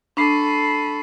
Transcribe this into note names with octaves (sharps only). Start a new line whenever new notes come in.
D4 A4 B5 C#6 C7